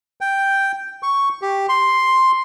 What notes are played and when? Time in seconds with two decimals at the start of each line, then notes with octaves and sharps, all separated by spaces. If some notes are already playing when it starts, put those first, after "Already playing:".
0.21 G5
1.03 C#6
1.42 G4
1.69 C6